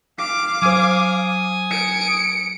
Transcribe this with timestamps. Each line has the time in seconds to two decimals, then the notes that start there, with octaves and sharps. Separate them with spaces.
0.18 F5 D6
0.62 F#3 C5 G#5 D#6
1.71 C#7 D7